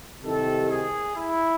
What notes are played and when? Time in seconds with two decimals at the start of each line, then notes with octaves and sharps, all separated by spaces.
0.24 C2 C3 D#3 A4
0.70 G#4
1.16 E4